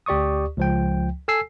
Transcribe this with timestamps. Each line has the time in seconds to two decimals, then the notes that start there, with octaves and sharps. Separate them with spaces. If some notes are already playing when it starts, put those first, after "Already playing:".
0.06 D2 G4 D5 C#6 D#6
0.57 C#2 F3 G5
1.28 A4 G#5 E6 C7